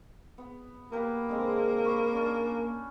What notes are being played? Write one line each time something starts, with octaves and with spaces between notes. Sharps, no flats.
B3
A#3 G4 B4
D3 G#3 C4
B5 C#6
C#4 D4